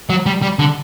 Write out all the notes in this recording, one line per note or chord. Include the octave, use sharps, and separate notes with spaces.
F#3
G3
G3
D3